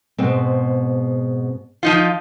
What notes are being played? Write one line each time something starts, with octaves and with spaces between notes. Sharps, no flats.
G#2 B2 C4
F3 D#4 F4